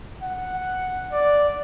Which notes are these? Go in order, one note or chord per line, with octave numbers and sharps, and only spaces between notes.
F#5
D5